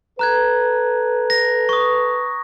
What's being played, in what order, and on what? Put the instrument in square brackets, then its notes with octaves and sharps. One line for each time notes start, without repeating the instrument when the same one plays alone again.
[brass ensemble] A4 B4 [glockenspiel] A#5 F#6 G#6
[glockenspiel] A#6
C#6 D#6